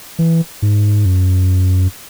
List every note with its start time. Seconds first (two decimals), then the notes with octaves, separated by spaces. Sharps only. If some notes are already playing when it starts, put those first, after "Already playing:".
0.19 E3
0.62 G#2
1.05 F#2